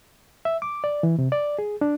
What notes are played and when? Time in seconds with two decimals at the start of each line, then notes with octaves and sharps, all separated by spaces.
0.45 E5
0.62 D6
0.84 D5
1.03 E3
1.19 C3
1.32 D5
1.59 G#4
1.81 D4